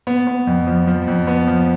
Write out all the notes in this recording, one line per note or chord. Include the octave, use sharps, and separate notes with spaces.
B3
B3
F2
F3
F3
F2
B3
F3